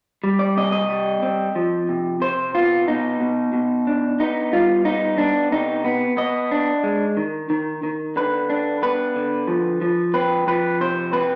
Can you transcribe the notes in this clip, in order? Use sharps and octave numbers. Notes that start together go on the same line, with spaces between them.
G3
D5
C3 D#5
D#5
G3
C4
F3
C3
C3 C5
B3 F4
B2 D#4
B2
B2
D4
B3 D#4
G3 F4
B3 D#4
B3 D4
C3 D#4
B3
B3 D#5
D4
G#3
D#3
D#3
D#3
D3 B4
D4
B3 B4
D3
F3
F3
C4 B4
F3 B4
C3 C5
C4 B4